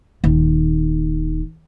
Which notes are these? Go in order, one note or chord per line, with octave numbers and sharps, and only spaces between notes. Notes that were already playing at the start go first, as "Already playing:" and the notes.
D#1 D#3